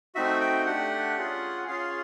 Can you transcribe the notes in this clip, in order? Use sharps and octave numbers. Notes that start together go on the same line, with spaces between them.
A3 C4 D#4 F#4 E5
G5
A3 D4 G4 F#5
C#4 F4 G#4
C#4 F4 G#4 F5